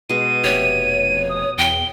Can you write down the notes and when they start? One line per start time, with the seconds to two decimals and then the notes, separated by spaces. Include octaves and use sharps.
0.09 B2 G#3 D#7
0.44 F1 G4 C#5 E5
1.30 D#6
1.58 E2 G5 G7